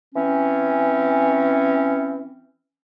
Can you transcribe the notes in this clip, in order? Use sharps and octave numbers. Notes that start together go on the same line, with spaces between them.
E3 C4 C#4